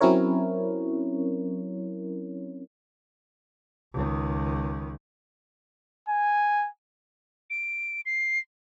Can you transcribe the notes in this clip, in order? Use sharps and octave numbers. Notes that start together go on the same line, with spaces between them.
F#3 C4 C#4 E4 A#4 C#5
C#2 D#3
G#5
D7
C7